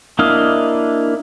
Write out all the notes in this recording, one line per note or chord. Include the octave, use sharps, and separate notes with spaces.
A#3 D4 E4 D#5 F5